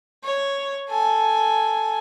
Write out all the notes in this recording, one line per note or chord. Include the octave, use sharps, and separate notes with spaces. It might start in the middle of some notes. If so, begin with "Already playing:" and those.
C#5
A4 G#5